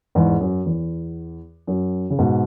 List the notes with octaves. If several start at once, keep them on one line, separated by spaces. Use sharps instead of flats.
E2 G#2
F#2
E2
F#2
C#3
G#2 B2